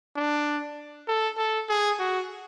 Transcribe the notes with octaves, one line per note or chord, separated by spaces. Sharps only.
D4
A4
A4
G#4
F#4